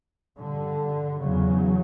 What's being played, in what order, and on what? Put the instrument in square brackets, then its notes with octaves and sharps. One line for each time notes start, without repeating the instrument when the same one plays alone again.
[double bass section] G2 D3
E2 C#3 F#3